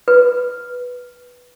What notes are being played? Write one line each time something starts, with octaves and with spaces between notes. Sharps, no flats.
B4